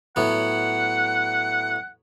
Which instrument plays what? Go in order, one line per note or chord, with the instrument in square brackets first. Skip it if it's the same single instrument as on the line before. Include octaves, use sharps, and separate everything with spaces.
[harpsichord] A2 F#3 B3 [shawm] F#5